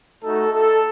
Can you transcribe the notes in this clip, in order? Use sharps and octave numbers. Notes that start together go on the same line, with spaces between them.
A3 D#4 F#4 A4
A4